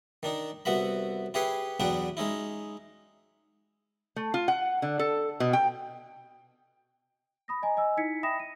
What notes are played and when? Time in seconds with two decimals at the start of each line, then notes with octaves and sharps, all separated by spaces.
0.23 D#3 D4 D#4
0.65 C2 B3 F#4 E5 B5
1.34 E4 G4 G#4 B4 C#5 C6
1.80 E2 F#3 B3 D4 B4 G5
2.17 G#3 C#4 D#4 E4
4.16 A3
4.34 F4
4.48 F#5
4.82 D3
4.99 A4
5.40 B2
5.53 G5
7.48 B5 D#6 A#6
7.63 D#5 G#5 A#5
7.77 D#5 G#5 E6
7.97 D#4 E4 G#6 B6 C#7
8.23 E5 G5 B5 D#6 A#6 E7
8.40 D#7